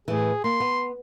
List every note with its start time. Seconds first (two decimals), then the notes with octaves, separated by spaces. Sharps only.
0.08 A2 E3 G#4
0.44 A#3 C6
0.60 B3